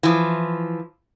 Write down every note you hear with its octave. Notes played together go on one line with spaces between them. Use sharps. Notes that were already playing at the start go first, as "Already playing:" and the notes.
E3 F3